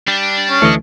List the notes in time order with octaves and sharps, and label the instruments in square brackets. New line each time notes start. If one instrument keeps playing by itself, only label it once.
[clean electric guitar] G3 [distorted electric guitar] D4
[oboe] C#4
[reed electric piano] D2 E3 A3 [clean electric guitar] A4 C#5 D#5